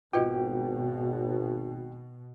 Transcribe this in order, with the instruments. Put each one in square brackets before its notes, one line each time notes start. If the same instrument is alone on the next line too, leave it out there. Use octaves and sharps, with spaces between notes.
[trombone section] G#1 [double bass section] B2 [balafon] F4 B4 D#5 [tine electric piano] F#4 G5